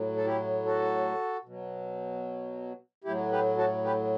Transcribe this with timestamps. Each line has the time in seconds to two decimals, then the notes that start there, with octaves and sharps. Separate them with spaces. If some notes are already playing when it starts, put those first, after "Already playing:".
Already playing: A2 F#3
0.17 A4
0.25 E4 G4
0.65 F#4 A4
1.45 B2 F#3
3.04 A2 F#3 E4 G4
3.32 G4 B4
3.58 F#4 A4
3.84 G4 B4